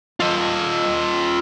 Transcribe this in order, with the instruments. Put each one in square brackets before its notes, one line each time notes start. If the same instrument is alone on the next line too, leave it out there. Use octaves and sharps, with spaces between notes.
[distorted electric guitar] F4 D#5